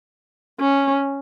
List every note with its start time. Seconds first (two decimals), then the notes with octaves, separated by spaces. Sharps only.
0.60 C#4